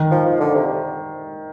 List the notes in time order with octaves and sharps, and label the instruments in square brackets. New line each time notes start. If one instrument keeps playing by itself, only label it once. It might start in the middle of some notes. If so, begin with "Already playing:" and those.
Already playing: [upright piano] D#3
[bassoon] F3
F3
D3
C3